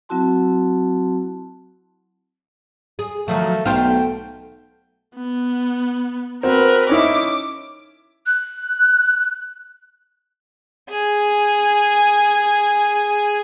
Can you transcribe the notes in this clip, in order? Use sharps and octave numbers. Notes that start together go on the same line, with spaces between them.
F#3 C4 E4 F#4 A5 C6
G#4
D#3 F3 F#3 A3
B1 A3 C5 F5 G5
B3
C4 F#4 A#4 B4
C#4 D#4 E4 D6
F#6
G#4 G#5